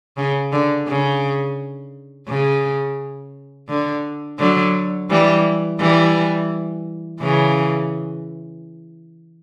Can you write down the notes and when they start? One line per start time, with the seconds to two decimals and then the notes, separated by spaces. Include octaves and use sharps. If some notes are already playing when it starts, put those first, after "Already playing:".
0.17 C#3
0.52 D3
0.87 C#3
2.28 C#3
3.69 D3
4.39 D3 F#3
5.10 E3 G3
5.80 E3 G3
7.21 C#3 E3